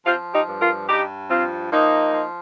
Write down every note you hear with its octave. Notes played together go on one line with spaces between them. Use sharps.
F3 C4 F4
D#4 G4
G2
F4 A#4
G2 D#4 G4
F3 C4 F4
F3 A#3 D#4
F3